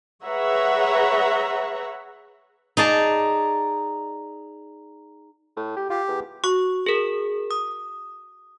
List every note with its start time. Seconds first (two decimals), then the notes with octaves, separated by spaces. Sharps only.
0.24 G#4 B4 C#5 E5 F#5 A#5
2.77 D#4 G#4 D5 A5
5.57 A2
5.77 G4
5.90 F4 G4
6.08 E2
6.44 F#4 C#6
6.86 G#4 A#4
7.51 D#6